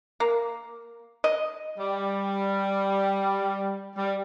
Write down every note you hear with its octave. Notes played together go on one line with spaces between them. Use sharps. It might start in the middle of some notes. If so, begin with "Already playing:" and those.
A#3
D#5
G3
G3